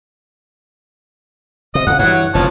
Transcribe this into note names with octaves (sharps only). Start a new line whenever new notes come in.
C3 D#5
E2 C#3 F#5
G2 E3 C#5 F#5
F1 C#3 F3 C#5 A5